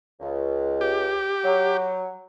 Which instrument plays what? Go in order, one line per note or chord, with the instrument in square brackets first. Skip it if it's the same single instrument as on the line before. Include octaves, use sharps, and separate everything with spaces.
[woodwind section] C#2
[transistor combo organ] G4
[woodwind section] F#3